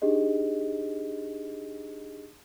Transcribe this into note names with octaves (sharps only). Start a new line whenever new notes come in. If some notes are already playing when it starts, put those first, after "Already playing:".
D4 D#4 G4 G#4 D#5